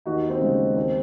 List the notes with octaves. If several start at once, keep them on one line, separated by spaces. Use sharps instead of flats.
D#2 D#4 F#4
C4 D#4
C#3 G#3
D#2 C4